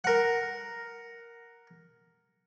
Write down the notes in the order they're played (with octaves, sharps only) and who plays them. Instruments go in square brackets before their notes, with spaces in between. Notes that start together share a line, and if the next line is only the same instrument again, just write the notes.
[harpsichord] A#4 F#5